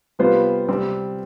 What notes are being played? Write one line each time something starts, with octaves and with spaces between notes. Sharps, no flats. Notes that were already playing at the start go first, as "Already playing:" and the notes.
C3 G3 B3 F4 C5
C3 G3 C4